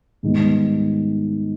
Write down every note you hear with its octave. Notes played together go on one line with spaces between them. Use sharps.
G#2 D#3 G3 B3